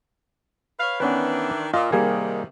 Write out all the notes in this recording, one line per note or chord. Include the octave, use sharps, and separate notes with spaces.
B4 C#5 F5
D#3 E3 B3 C#4 D4 B4
A#2 F4 D#5
C3 D#3 G3 A#3 G#4